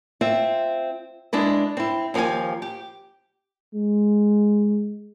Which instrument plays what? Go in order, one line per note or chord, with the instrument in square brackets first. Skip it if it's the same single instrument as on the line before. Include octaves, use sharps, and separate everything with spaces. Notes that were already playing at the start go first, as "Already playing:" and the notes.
[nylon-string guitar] C4 F4 E5
G#3 D4 E4 B4
C4 E4
D#2 F3 G4 F5 G#5
G4
[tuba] G#3